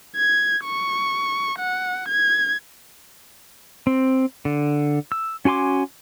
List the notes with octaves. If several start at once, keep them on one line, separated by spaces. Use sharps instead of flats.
G#6
C#6
F#5
G#6
C4
D3
E6
C#4 F#4 G#5 C6 D6